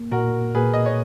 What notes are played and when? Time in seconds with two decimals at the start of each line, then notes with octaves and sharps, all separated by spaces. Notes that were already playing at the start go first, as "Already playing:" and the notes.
Already playing: A#3
0.12 A#2 F#4 A#4
0.55 A#2 G#4 B4
0.73 D#5
0.86 C#5